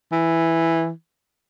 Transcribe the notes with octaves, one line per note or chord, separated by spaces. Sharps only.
E3